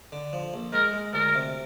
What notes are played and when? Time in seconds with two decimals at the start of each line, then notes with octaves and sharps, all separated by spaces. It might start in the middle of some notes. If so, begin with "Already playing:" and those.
0.12 D3
0.33 F3
0.54 A#1
0.73 G#3 A#4
0.93 G#3
1.13 D2 A#4
1.35 C3